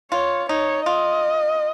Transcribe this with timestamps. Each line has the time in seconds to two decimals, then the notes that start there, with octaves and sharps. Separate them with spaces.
0.12 F4 C#5
0.49 D#4 C#5
0.86 F4 D#5